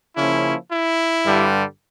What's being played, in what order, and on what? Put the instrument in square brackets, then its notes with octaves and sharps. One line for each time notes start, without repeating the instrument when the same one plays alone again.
[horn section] C#3 F3 A#3 C#4 E4
E4
G2 D3 G3